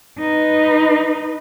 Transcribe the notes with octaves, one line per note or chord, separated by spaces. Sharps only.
D#4 B4